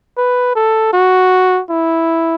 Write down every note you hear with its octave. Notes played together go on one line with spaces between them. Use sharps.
B4
A4
F#4
E4